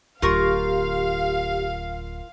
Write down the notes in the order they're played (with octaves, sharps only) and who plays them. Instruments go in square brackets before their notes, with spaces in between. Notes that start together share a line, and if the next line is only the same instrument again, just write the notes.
[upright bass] D1 D3 [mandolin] F4 A#4 C#6 [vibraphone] G4 [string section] F5